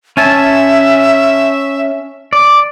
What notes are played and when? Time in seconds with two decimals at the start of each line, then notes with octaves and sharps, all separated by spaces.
0.17 C#4 E5 G#5 A5
2.33 D5